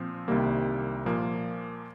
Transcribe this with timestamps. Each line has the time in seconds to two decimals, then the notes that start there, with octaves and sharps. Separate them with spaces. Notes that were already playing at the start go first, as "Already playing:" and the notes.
Already playing: A#2 F3 C4
0.28 C2 C3 D#3 G3 A#3
1.06 A#2 F3 A#3